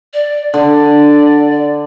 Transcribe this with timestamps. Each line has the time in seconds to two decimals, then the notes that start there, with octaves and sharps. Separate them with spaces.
0.14 D5
0.54 D3 D5